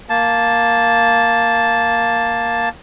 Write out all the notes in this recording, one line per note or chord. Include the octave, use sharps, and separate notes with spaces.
A#3 A5